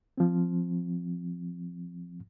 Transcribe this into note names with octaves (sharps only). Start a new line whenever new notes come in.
F3 C4